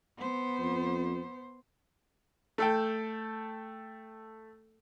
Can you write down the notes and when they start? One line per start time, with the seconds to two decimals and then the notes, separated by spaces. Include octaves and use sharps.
0.17 B3 C5
0.59 F2
2.58 A3 A4 G5